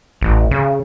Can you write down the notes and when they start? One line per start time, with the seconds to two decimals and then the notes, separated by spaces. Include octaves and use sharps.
0.21 A1
0.51 C#3